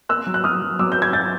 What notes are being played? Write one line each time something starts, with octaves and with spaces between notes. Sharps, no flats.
A#3 E6 F#6
F#3
F#6
F#3 D#6 F6
F#3
F#3 D6 E6
A#3 G6
G#6
F#3 G6 A6